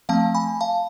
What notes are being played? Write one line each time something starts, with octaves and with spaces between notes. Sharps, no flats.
F3 A3 C4 F5 A5
G#5 B5
F5 A5